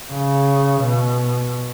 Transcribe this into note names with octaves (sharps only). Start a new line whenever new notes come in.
C#3
B2